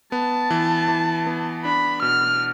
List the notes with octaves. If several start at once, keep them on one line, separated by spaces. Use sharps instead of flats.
B3 A5
E3
E3
B3
D4 B5
B2 F6